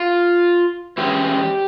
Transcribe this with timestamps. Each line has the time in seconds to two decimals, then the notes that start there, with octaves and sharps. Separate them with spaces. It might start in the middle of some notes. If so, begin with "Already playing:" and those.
Already playing: F4
0.98 E3 G#3 C#4 G4